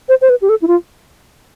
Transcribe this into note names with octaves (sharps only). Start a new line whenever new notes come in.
C5
C5
B4
G4
A4
E4
F4